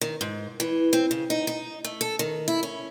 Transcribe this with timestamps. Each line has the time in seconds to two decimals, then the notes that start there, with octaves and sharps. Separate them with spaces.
0.01 D#3
0.21 G#2
0.60 E3
0.93 C4
1.11 C#3
1.30 D#4
1.47 D#4
1.85 A3
2.01 A4
2.19 D#3
2.48 E4
2.63 C#4